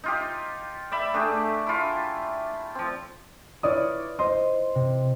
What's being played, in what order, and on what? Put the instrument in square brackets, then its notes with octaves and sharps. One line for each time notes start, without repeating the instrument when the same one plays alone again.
[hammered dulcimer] D#4 F4 G4
D5 E5 B5
A3 D4 G4 G#4
E4 F4
F3 C4
[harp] E4 F4 B4 [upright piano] C#5 D5 D#6
[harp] C5 D#5 [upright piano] C6
[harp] C3